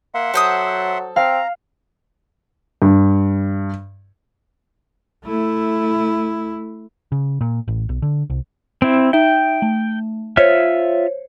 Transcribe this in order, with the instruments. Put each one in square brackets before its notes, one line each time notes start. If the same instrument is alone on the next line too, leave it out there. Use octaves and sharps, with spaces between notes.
[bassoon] A#3 [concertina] E5 F#5 C6
[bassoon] F#3 [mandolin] A4 C5 D#6
[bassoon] C4 [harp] F5 [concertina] A#5
[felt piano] G2
[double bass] A3 E4
[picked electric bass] C#3
A#2
A1
B1
D3
C2
[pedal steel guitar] C4 E4
[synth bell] D#4 E5 [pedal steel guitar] G5
[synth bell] A3
[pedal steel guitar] F4 E5 F6 [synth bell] C5 C#5